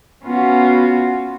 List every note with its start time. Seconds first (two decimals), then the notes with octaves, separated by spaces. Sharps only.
0.23 B3 C#4 F4 F#4